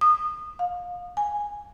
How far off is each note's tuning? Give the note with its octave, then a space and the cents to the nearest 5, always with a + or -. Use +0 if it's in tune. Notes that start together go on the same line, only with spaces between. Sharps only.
D#6 -25
F5 +25
G#5 -10